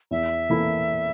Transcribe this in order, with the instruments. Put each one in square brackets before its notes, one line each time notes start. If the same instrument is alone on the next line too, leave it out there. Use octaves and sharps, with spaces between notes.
[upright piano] E2 [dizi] E5
[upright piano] E3 A#3 E4 A4